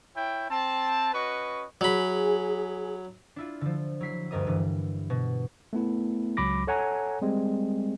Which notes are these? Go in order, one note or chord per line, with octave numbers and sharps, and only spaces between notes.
E4 C#5 G5
C4 A5
C#4 F#4 B4 D#5 C#6
F#3 G#4 B5
D4 E4 F4
D3 F3
F#3 E4 B6 C7
D2 G2 G3 A#4 D#5 D#6
G2 D3 E3
B2
A3 B3 E4
C#2 F#3 B5 D6 A#6
A4 C#5 F#5 G#5 A#5
G3 G#3 C4